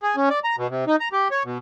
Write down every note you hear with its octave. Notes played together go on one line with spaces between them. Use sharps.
G#4
C#4
D5
A#5
B2
C3
D#4
A#5
G4
C#5
B2